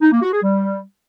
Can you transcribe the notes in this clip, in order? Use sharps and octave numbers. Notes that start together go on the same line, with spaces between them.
D#4
A#3
F#4
G#4
G3